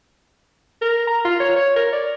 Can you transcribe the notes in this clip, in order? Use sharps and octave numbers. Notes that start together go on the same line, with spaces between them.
A#4
A#5
F4
C#5
C#5
A#4
D5